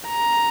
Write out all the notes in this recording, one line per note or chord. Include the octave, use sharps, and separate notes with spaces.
A#5